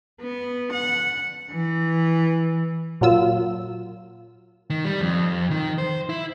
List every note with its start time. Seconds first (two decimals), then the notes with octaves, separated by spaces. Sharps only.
0.21 B3
0.72 F#5
1.51 E3
3.01 A#2 F#3 F4 E6
4.70 D#3
4.85 G3
5.01 F2
5.51 D#3
5.78 C5
6.09 E4